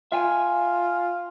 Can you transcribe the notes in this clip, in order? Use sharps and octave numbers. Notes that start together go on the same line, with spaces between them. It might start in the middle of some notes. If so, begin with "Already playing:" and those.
F4 E5 G5 G#5